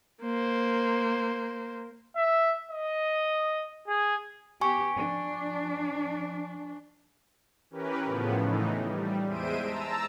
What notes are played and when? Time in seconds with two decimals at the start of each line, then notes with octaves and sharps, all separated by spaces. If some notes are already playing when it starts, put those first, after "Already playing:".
0.23 A#3 C5
2.16 E5
2.72 D#5
3.88 G#4
4.61 B3 G4 G#5 C#6
4.95 F3 D4
7.70 E3 C#4 G4 A#4 B4
8.04 A2 C#3 F3 B3
8.40 A2 E3 D#4
8.81 G3
9.26 E2 G#3 C5 E5 D7 D#7
9.60 A5 A#5 E6